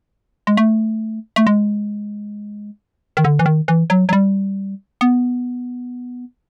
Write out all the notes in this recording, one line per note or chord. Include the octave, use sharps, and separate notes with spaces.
G#3
A3
A3
G#3
D#3
D3
E3
D#3
E3
F#3
F#3
G3
B3